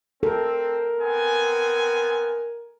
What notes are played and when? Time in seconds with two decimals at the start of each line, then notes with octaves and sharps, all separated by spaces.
0.23 C4 A4 A#4
0.99 B3 C4 G#5